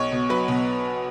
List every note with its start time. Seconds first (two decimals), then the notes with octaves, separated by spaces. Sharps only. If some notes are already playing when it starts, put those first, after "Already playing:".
Already playing: B1 C#5
0.12 B2
0.29 F#3 B4
0.48 B2